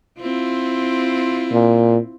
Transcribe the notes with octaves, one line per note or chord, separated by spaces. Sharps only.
C4 E4 F4
A#2